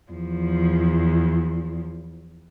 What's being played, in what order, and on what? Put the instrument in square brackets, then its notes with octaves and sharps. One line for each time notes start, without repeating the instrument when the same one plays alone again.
[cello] E2 F3